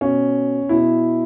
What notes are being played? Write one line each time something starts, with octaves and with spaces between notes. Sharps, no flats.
B2 C#4
B2 E4